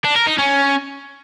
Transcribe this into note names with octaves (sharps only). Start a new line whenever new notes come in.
D4
A#4
D#4
C#4